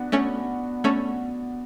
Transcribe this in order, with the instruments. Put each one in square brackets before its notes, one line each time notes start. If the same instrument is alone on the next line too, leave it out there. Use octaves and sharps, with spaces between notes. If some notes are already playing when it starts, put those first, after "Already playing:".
Already playing: [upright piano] B3 D4 F#4
[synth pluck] A3 C#4
A3 C#4